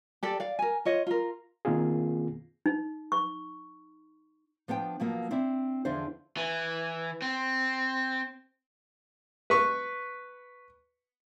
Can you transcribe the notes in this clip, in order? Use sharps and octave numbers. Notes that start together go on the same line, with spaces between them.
G4 A4 D5
D5 F5
A#4 G#5
F4 C#5 D#5
F4 A#4
B2 D#3 A#3 C4 F4 G#4
D#4
C#6
F3 B3 D4 G5
B2 F3 F#3 A#3
C4 D4 E4
E2 D3 F3 D4 E4 C5
E3
C4
B4 C#6